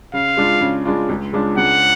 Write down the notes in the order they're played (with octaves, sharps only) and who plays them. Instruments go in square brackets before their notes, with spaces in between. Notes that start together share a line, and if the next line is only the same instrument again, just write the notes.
[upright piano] C#3 [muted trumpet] F5
[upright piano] G#3 D4 F4
C#3
G#3 D4 F4
C#2
C#3 G#3 D4 F4
[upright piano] C#2 [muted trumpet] F#5